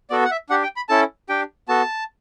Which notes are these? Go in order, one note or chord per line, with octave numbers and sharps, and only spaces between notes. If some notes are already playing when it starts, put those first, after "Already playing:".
B3 F#4 A4 D5
F#5
E5
D4 G4 F#5
G5
B5
C#4 E4 A4 A5
D4 G4 G5
B3 F#4 A4 A5